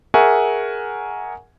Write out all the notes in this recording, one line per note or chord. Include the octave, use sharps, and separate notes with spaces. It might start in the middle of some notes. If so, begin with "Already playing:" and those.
G#4 A#4 E5 F#5 G#5 C#6